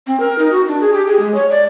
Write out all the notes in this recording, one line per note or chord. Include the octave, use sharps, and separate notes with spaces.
C4
A#4
D#4
F#4
D4
G#4
G4
G#4
G#3
C#5
D5